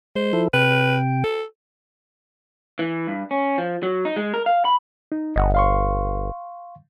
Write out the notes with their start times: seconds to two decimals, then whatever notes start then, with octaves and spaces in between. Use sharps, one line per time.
0.16 G#3 C5
0.33 F3 E4 A4
0.53 C3 B4 G5
1.24 A4
2.79 E3
3.07 G2
3.31 C#4
3.58 F3
3.83 F#3
4.05 D#4
4.16 G#3
4.34 A#4
4.46 F5
4.65 B5
5.12 D#4
5.36 G1 D#5 F#5
5.55 F5 C6 C#6